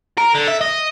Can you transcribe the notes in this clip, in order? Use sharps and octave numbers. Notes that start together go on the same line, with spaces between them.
A#4
D3
E5
D#5